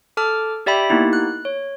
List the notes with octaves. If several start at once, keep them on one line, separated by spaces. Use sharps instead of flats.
A4 A5 D6 F6
G4 D5 E5 G5 B5
A#3 B3 D#4 E4 G4
F#6
C#5